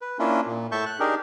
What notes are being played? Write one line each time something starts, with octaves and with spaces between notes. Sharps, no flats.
B4
A#3 C#4 D4 E4 F4
A#2
A2 E5 A5 C#6 G6
F#6
D4 D#4 G4 G#4 A#4